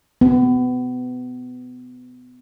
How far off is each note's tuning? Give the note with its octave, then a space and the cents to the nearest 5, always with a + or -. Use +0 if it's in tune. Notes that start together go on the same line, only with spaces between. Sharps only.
B3 +25